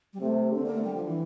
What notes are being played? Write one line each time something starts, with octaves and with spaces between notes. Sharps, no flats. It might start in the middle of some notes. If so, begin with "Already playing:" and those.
G3
C3 A3
D3 C4
A#3
A3
G3
F3
E3